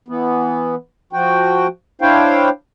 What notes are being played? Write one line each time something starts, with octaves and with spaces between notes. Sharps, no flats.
E3 B3
F3 F#4 G5
D4 E4 C5 C#5 F5 G5